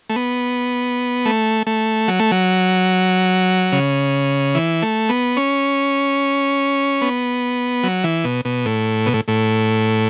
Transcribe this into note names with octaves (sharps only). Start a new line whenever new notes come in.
A3
B3
A3
A3
F#3
A3
F#3
C#3
E3
A3
B3
C#4
B3
F#3
E3
B2
B2
A2
B2
A2
A2